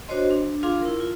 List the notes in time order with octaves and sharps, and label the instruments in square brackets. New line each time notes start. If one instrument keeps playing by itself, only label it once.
[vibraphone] D4 F#4 C5 C#5 D#5 C6
D4
D4 F4 G#4 F5 C6 D6
E4 A#4
F4